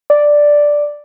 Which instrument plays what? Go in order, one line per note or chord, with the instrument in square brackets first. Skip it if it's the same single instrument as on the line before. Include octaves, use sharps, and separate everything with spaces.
[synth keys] D5